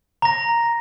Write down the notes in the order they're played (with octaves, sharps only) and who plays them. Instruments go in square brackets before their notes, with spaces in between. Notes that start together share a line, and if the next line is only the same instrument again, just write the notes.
[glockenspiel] A#5 A#6